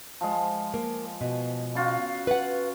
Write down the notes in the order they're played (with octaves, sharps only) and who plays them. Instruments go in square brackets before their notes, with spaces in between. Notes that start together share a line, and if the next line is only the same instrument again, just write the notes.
[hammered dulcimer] F3 G#3
[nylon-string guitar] A#3
B2
[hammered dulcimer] C#3 F4 F#4
[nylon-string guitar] B4 F#5